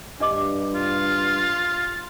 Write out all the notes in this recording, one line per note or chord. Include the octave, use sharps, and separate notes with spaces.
G2 D4 D#5 D6
F4